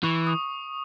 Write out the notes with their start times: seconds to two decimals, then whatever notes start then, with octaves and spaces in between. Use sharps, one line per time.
0.03 E3 C#6
0.27 D#6